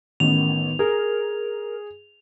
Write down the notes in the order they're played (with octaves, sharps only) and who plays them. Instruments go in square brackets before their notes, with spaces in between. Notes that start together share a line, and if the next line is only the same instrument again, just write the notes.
[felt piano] A1 [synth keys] D#3 B3 [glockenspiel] F7
[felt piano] G#4 [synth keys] A#4